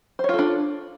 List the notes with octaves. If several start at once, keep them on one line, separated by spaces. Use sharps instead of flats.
D4 F4 A4 C5 C#5